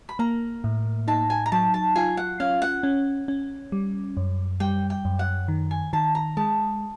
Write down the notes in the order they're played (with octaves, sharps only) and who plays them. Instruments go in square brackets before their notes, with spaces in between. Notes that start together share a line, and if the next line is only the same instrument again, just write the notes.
[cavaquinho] B5
[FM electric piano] A#3 [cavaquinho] A#5
[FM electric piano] A2
[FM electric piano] D#4 [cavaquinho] A5
[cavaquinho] G#5
A#5
[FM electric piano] F#3 [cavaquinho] A5
[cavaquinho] A5
[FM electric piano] F4 [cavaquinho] G#5
[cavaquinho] F#5
[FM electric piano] C#4 [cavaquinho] F5
[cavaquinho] F#5
[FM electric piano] C#4
C#4
G3
F#2
[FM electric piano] G3 [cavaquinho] G5
[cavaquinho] G5
[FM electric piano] F#2
[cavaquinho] F#5
[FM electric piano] D#3
[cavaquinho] G#5
[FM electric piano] D#3 [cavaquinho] A5
[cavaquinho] A#5
[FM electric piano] G#3 [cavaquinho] A5